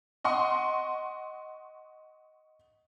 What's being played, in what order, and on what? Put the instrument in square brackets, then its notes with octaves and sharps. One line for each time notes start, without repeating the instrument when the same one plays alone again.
[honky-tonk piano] D#5 F#5 C6 C#6